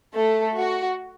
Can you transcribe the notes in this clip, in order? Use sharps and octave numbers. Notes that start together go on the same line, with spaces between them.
A3 A4
F#4